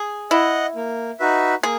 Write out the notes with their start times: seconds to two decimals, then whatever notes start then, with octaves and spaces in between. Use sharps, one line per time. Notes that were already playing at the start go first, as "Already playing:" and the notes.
Already playing: G#4
0.31 E4 D#5 F#5
0.75 A#3
1.20 D#4 F#4 B4 E5
1.63 A#3 G#4